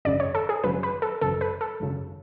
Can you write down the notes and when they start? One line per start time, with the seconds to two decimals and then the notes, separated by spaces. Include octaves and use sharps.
0.05 G#1 F#2 C#3 D5
0.20 C#5
0.35 A4
0.49 G#4
0.64 G#1 F#2 C#3 B4
0.83 B4
1.02 A4
1.21 G#1 F#2 C#3 A4
1.41 B4
1.61 A4
1.80 G#1 F#2 C#3